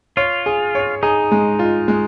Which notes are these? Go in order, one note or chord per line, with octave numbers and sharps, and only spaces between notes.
F4 C#5
G#4
C#5
D#4 G#4
G#3
F4
G#3